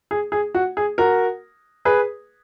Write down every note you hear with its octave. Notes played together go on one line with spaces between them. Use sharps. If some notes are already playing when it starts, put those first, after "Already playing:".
G#4
G#4
F#4
G#4
F#4 A#4
G#4 B4